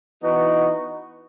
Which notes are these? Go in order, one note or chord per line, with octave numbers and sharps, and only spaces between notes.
E3 B3 D#4 F#4